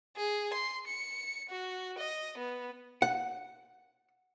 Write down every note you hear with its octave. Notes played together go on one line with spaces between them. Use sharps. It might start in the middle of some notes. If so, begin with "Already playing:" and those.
G#4
C6
C#7
F#4
D#5
B3
F#5